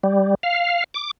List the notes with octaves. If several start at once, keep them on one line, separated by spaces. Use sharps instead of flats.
G3
F5
D6